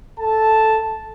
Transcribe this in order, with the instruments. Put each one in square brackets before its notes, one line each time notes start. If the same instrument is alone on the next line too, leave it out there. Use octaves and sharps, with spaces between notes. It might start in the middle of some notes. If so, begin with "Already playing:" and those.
[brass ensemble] A4 A5